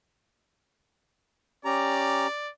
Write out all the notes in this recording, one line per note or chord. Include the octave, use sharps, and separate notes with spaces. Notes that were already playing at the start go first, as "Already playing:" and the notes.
C#4 G4 D5 A#5